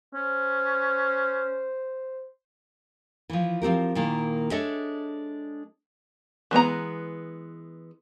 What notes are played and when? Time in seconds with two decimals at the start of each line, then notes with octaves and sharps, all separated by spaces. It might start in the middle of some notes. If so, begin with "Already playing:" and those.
0.15 C#4 C5
3.30 E3 F3
3.62 F3 C4 G4 A#4
3.95 A#2 D#3 A#3 E4
4.51 G#3 D4 A4 C#5 D#5 E5
6.51 E3 G#3 B3 A#5